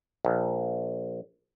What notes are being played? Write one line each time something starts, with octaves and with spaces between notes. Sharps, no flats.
A#1